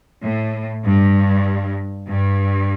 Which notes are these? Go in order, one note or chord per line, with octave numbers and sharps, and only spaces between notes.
A2
G2
G2